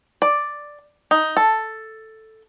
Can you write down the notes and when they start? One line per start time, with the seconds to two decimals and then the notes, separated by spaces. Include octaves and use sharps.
0.22 D5
1.11 D#4
1.37 A4